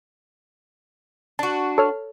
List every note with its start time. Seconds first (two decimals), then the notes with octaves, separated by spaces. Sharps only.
1.39 D4 F#4 A5
1.78 A4 C#5 F6